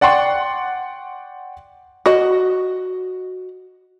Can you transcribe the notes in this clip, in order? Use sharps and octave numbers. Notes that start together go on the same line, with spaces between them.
D5 F#5 G5 C6 C#6
F#4 D#5